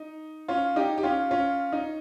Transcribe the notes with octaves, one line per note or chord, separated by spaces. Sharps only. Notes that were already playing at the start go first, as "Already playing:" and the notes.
Already playing: D#4
C#4 F4
D#4 G4
G4
C#4 F4
C#4 F4
D#4